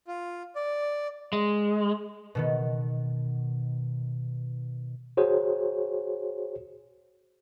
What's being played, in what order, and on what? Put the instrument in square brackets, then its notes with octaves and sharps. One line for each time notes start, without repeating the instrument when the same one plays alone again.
[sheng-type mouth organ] F4
D5
[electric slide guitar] G#3
[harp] B2 D#3 B3
[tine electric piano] F#4 G#4 C5 C#5